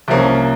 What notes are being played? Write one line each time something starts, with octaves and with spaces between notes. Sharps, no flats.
C2 C3 F3 A#3 C#4